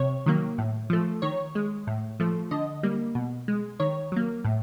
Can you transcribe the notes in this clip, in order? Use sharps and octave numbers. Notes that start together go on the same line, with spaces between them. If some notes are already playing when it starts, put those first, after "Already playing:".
Already playing: C3 C#5
D#3 F#3 A#3
A2
F3 A3
D#3 C#5
G#3
A2
F3 A3
D3 D#5
G3 A#3
B2
G#3
D#3 C#5
F#3 A#3
A2